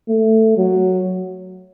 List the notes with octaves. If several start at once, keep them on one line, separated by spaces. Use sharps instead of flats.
A3
F#3